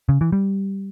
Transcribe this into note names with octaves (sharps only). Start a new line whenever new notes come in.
C#3
E3
G3